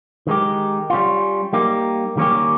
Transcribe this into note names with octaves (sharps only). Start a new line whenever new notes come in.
D#3 G#3 D#4 G4
G3 C#4 F4
G3 A#3 D#4 G4
D#3 G3 A#3 C#4 G4